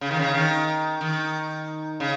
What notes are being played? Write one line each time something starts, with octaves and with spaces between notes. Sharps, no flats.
C#3
D#3
C#3
D#3
D#3
C#3